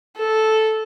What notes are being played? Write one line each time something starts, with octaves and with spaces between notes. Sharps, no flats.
A4